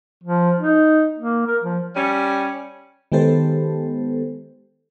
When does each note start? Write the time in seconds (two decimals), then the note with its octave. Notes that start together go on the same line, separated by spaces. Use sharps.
0.24 F3
0.59 D#4
1.19 A#3
1.47 A#4
1.63 F3
1.95 G3 C#4
3.12 D#3 G#3 B3 G4 A4 C5